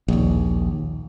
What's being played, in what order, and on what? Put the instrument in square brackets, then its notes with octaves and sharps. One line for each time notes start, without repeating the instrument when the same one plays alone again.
[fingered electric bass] A#1 D#2